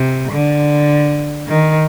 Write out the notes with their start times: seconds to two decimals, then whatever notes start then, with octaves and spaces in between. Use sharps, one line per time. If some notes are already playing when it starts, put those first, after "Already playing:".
Already playing: C3
0.31 D3
1.48 D#3